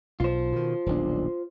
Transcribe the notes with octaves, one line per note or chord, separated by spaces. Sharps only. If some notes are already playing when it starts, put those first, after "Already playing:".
B1 F4 C5
B2 D#3
D#1 B1 D4